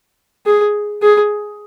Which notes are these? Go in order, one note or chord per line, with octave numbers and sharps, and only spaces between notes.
G#4
G#4